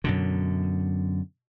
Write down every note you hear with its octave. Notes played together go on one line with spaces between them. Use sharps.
F#2 B2 D3